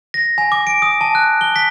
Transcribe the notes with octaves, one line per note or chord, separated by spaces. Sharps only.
A#6
G#5
D6
D7
D#6
A5
F#6
G7
B6